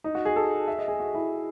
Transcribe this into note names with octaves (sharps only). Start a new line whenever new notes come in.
D#4
F#4
G#4
A4
E5
D#5
G#4
F#4
E4